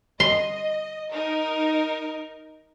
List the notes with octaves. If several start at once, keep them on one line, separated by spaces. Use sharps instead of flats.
D#5 C6
D#4 A#4